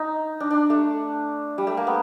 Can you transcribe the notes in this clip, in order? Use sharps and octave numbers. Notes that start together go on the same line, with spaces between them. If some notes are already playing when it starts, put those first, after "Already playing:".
Already playing: D#4
D4
D4
A3
G3
A3
A#3
B3